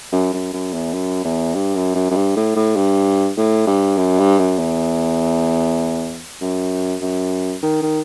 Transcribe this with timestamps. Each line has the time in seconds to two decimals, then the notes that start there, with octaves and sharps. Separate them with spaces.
0.12 F#2
0.33 F#2
0.53 F#2
0.73 E2
0.93 F#2
1.24 E2
1.54 G2
1.75 F#2
1.95 F#2
2.10 F#2
2.16 G2
2.36 A2
2.56 A2
2.76 G2
3.37 A2
3.67 G2
3.97 F#2
4.18 G2
4.39 F#2
4.59 E2
6.41 F#2
7.01 F#2
7.63 D#3
7.83 D#3